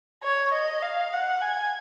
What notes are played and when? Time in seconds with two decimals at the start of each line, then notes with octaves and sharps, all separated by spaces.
0.23 C#5
0.53 D#5
0.82 F5
1.13 F#5
1.41 G#5